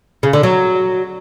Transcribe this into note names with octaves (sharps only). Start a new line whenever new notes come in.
C#3
D3
F#3